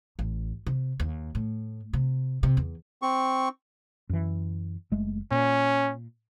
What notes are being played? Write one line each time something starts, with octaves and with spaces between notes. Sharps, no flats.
A1
C3
D#2
A2
C3
C3
E2
C4 C#6
F#2 E3
F#1 G#3 A3
A#2 C#4